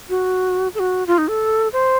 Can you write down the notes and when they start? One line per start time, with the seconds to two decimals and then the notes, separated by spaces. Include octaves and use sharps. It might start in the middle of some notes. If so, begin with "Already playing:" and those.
0.09 F#4
0.75 A4
0.79 F#4
1.07 F4
1.18 D#4
1.29 A4
1.73 C5